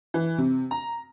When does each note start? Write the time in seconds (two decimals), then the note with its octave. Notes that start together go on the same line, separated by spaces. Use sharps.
0.14 E3
0.38 C3
0.71 A#5